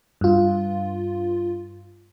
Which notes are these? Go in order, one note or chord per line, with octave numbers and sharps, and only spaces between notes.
G2 F4